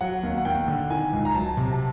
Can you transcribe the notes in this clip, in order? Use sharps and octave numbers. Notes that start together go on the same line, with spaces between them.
F#3 F#5
D#2
F#5
D#2 G5
D3
D#3 G#5
C#2
A#5
F#3 A5
C3
A5